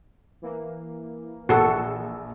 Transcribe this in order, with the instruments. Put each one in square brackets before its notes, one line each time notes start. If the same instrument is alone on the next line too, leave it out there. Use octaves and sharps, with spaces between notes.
[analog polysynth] E3 A#3
[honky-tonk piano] A#1 E6 [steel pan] F#4 A4